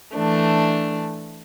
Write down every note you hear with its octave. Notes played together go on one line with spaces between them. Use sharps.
E3 A3 D4